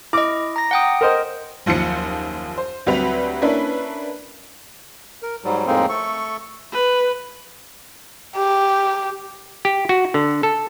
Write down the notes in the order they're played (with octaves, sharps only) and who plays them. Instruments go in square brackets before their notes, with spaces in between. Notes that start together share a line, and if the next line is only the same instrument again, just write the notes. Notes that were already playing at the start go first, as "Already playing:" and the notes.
[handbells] E4 D#5 [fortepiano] D6
[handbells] A#5 A#6
F#5 G5 D#6
[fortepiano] A#4 C5 D#5
[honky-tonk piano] F#1 D#2 F3 C5 C#7
C5
D2 F#3 G3 C4 B4 F7
A#3 C#4 D4 E4 B4
[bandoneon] A#4
G#2 F#3 G3
F2 A2 G#3 A#3 C4 D#4
A3 A4 C#6
[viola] B4
[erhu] G4
[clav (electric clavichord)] G4
F#4
D3
A4